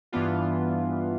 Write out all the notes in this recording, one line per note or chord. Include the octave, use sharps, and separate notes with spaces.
G2 E3 B3 D4 F4